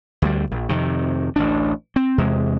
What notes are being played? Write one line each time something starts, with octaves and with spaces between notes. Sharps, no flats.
D2 G3
A#1
F2 C3 D#3
A1 D2 D4
C4
E2 C3 G#3